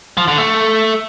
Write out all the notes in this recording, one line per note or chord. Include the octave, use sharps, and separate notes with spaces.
F3
D3
A3